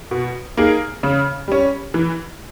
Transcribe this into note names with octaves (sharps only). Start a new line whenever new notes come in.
B2
A#3 D#4 G#4
C#3
G3 C#4
E3